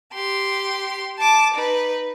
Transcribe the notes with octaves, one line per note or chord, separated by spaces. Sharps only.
G4 C6
A5 D6
D#4 B4